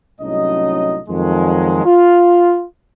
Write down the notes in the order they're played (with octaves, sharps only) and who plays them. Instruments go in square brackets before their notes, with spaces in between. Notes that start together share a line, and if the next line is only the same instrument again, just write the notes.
[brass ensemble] C2 A2 F#3 C#4 D#4 D#5
F2 D#3 F#3 G#3
F4